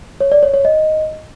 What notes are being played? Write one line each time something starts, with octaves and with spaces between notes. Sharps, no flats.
C#5
D5
C#5
C#5
D#5